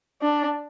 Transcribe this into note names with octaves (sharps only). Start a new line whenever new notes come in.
D4